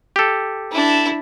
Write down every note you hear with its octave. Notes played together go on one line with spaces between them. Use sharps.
G4 A4
D4 E4